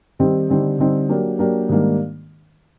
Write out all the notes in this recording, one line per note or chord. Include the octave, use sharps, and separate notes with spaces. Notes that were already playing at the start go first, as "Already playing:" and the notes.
D#3 G3 C4 D#4 G4
D3 G3 C4 D#4
D3 G3 C4 D#4
F#3 A#3 D4 G4 A#4
F#3 A#3 D4 G4 A#4
G#2 D#3 G3 A#3 D4